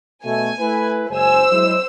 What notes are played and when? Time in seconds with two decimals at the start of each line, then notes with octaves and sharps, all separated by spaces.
0.24 B2 A3 G#5
0.59 A3 E4 B4
1.10 F#1 G#3 C5 G#5 E6
1.51 F#3 G#3 E4